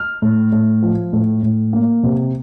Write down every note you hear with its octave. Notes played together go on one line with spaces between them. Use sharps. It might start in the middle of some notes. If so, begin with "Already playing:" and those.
Already playing: F6
A2
A2
F3
A2
A2
A#3
C3